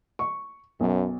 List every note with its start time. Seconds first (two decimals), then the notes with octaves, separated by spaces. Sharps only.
0.19 C#6
0.81 B1 F#2